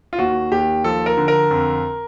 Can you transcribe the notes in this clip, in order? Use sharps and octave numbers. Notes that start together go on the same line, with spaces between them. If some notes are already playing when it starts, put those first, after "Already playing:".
F4
D#2 F#4
D#2 G4
F3 A4
A#4
D3
A#4
F2